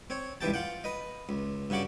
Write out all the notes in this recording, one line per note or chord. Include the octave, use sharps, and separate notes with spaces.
C4 C#5
C#2 G2 E3 G4 G5 A5
F4 F#5 G5
B4 D#5
C#2
G2 C#3 F#4 F#5 D6